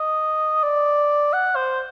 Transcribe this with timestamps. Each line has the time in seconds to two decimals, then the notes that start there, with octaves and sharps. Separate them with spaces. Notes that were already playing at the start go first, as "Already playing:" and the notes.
Already playing: D#5
0.63 D5
1.33 F#5
1.55 C5